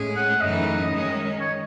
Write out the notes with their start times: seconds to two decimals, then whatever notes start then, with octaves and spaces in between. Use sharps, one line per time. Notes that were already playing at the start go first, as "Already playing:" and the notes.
Already playing: A2 G#3 C#4 G#4
0.16 F#5
0.40 F#2 C#3 E3 A3 D#4 D#5
0.90 D#3 G#3 C#4
1.40 C#5